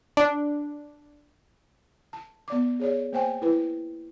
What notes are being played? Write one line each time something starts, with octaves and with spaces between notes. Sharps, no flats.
D4
A5
B3 D5 D6
G#4 C#5 D5
A#3 C5 G5 G#5
E4 B4